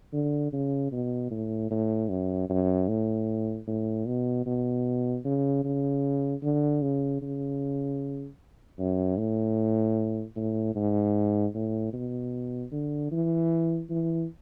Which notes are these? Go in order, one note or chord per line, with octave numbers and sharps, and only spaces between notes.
D3
C#3
B2
A2
A2
F#2
F#2
A2
A2
B2
B2
C#3
C#3
D3
C#3
C#3
F#2
A2
A2
G#2
A2
B2
D3
E3
E3